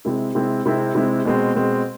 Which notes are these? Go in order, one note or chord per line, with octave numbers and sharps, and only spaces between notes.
C3 G#3 C4 E4
C3 G#3 C4 E4
C3 G#3 C4 E4
C3 G#3 C4 E4
B2 G#3 C4
B2 G#3 C4